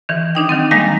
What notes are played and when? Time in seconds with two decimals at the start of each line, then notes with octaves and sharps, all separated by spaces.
0.09 D#3 E3
0.35 D4 D#4 G5
0.49 D#3 F#3 C4
0.71 D#3 G3 G#3 A#3 F5 G#5